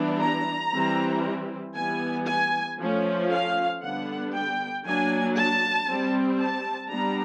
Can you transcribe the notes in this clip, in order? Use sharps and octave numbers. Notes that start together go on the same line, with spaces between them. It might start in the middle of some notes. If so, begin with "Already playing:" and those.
Already playing: E3 G3 B3 D4
A#5
E3 G3 C4
E3 G3 B3 G#5
G#5
F3 A3 C#4
F5
D3 G3 B3 D4 F#5
G5
F#3 A#3 D4 G#5
A5
G3 C4
A5
G3 B3 D4 A#5